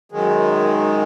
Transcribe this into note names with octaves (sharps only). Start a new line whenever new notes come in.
F#2 D#3 G#3